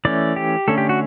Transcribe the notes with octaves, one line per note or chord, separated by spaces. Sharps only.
E3 A3 C#4 D5
G4
D3 A3 C#4 A4
G4
F#4